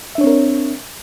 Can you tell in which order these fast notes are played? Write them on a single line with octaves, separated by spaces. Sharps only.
E5 D4 C#5 C4 A#4